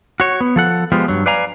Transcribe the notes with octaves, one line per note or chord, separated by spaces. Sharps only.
F#4 C#5
B3
F3 A4 F#5
F3 G#3 B3 F4 G4
G2 F#3
B4 D5 F5 G#5 A#5